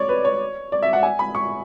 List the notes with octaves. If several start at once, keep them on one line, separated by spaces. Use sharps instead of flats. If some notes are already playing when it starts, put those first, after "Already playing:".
Already playing: C#5 D5
B4
C#5
D5
E5
F#5
G#5
B5
C#6